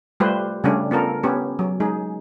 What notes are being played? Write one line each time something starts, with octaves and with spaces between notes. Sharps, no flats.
G3 A3 F4 G4 B4 C5
C#3 G3 A3 C#4 D4
B3 F4 A4 A#4
B3 C#4 G4
F#3
G#3 D#4 G#4